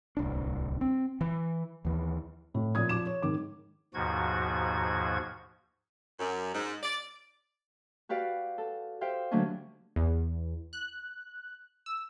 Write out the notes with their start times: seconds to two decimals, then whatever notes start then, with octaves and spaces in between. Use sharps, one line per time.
0.17 D1 C2 D4
0.81 C4
1.21 E3
1.85 D#2 E3
2.54 A2
2.75 A#2 F3 D#6 G#6
2.89 F3 D6 E7
3.06 C#5
3.22 G#2 D#3 D6
3.94 D#2 G#2 B2 F3 F#4 G#6
6.19 F#2
6.53 G#2
6.83 D5
8.09 F#4 G4 B4 D5 F5
8.58 A4
9.01 G4 C5 E5 F5 G5
9.31 D3 F#3 A3 A#3 C#4 D4
9.96 E2
10.73 F#6
11.86 E6